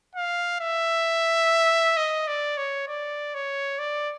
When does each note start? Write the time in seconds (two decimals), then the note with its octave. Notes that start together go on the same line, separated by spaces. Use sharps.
0.15 F5
0.60 E5
1.97 D#5
2.28 D5
2.57 C#5
2.88 D5
3.34 C#5
3.79 D5